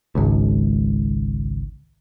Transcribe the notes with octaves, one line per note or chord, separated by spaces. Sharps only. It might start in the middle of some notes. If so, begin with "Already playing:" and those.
G#1 C#2